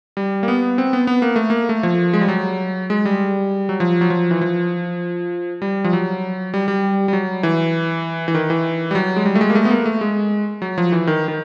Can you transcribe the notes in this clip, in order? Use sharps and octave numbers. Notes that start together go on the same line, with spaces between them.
G3
A#3
B3
C4
B3
B3
A#3
A3
A#3
A3
F3
G#3
G3
F#3
G#3
G3
F#3
F3
F#3
F3
E3
F3
G3
F3
F#3
G3
G3
G3
F#3
E3
E3
D#3
E3
G3
F#3
G#3
G3
A3
G#3
A#3
A3
B3
A#3
A3
G#3
F#3
F3
E3
D#3
D#3